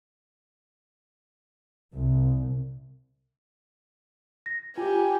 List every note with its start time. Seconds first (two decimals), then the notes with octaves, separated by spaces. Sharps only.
1.93 C2
4.46 A#6
4.77 F4 G4 G#5